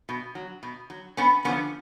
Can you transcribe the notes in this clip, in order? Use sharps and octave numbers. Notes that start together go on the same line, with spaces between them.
B2
F#3
B2
F#3
G2 B3 C#4
D3 F3 B3 C#4